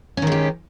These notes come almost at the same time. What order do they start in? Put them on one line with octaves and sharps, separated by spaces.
C#4 D#3 G#3 G4